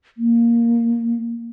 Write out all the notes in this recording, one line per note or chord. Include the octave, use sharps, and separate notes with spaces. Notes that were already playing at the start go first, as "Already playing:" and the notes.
A#3